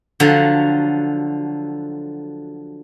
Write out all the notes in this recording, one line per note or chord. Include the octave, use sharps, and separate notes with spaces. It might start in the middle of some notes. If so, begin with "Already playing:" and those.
D3 F3 F#3